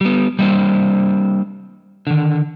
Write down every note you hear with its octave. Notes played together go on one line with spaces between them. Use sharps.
G3 B3
G3 A#3 C4 D4 C5
D3 D#3